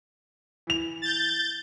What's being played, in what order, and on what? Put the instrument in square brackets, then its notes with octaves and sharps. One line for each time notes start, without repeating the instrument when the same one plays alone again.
[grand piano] E3 F7
[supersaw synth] G6 A6